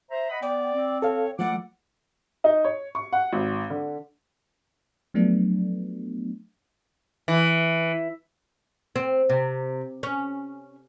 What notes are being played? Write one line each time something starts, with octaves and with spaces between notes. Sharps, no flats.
C5 E5 A#5
D#5 F#5 B5
B3 D5 G5
C4
A4 C#5 F5
F3 G3 A3 A4 F#5 D6
D#4
C#5
C#6
F#5
G#1
D3
F3 F#3 A3 B3 D4
E3
C4
C3
C#4